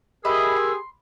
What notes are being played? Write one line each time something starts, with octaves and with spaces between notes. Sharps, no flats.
G4 G#4 A#4 B4 D#5 E5 E6
C6